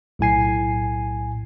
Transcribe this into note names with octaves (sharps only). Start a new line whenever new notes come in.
B1 A2 G#5 C7